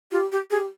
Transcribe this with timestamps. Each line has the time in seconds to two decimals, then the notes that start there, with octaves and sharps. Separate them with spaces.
0.12 F4 G4
0.32 G4
0.51 G4 G#4